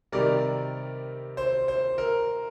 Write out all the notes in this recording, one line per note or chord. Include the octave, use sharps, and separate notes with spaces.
C3 D#3 G3 A#4 D5
C5
C5
A#4